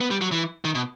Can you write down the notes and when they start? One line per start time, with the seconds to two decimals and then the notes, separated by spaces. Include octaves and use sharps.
0.01 B3
0.11 G3
0.21 F#3
0.32 E3
0.65 D#3
0.75 B2